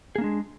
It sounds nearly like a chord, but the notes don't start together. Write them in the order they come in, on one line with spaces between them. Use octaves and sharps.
G#4 A#3 D4 G#3